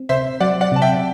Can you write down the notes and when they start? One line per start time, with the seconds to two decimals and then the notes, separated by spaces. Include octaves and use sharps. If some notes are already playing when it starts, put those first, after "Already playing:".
Already playing: C4
0.09 C3 C5 E5
0.40 F#3 D5 F#5
0.61 D5 F#5
0.72 C3 A5
0.82 E5 G5